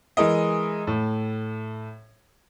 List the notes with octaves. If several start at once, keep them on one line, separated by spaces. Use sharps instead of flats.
E3 G#3 A#4 D#5
A2